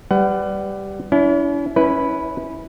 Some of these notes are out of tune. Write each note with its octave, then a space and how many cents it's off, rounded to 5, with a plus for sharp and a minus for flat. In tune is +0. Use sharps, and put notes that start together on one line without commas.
G3 +0 B4 +25 F#5 +25
C#4 +45 E4 +0
C#4 +0 E4 -25 B4 +0